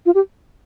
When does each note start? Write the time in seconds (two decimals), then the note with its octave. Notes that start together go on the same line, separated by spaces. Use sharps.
0.06 F4
0.15 G4